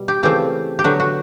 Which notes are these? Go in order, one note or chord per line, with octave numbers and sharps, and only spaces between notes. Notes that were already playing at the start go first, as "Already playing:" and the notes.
Already playing: B2 G3
G4
C#3 E3 A3 C4 F4 G4
G4
D3 F#3 B3 F#4
F#4